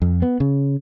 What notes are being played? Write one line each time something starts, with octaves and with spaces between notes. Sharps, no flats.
F2
B3
C#3